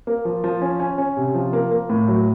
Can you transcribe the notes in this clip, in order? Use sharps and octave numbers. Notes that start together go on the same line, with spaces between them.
A#3
F3
F3
C#4
C#4
C#4
C3
F3
A#3
A#3
A2
F#3